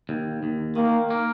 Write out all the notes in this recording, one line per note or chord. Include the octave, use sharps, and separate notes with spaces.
D#2
D#2
D#3 A#3
A#3